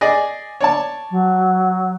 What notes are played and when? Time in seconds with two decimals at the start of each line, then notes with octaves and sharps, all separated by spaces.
0.01 G#4 D5 D#5
0.61 C#5 D5 A5
1.11 F#3